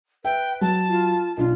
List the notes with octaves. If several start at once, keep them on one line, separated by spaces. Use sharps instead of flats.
B4 E5 G5
F#3 A5
F4
B1 D4 F4